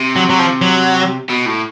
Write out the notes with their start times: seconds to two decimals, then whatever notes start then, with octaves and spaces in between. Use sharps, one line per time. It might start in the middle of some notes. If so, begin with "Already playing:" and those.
Already playing: C3
0.16 F#3
0.30 F#3
0.39 F3
0.62 F#3
1.30 B2
1.46 A2